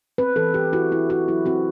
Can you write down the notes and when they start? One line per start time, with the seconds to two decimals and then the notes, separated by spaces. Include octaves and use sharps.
0.18 C4 B4
0.36 E3 A4
0.54 E3 G4
0.73 E4 F#4
0.92 C4 E4
1.10 E4 F#4
1.28 F#3 E4
1.46 C4 F#4